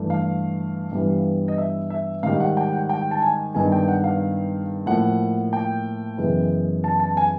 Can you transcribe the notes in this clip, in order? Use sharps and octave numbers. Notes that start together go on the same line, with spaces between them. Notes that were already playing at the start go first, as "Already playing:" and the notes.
Already playing: G2 E3 A3
F5
G2 E3 G3 B3
D#5
E5
E5
G#2 D#3 G3 F5
F#5
G5
F#5
G5
A5
G#5
G2 D#3 G#3 B3 G#5
G5
F#5
F5
A2 F3 A#3 F#5
G5
F#2 C#3 E3 G#3 B3
A5
A5
G#5